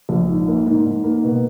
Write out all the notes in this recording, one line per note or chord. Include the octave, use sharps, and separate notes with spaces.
A#1
G#2
A#3
G#2
G#2
A#3
B2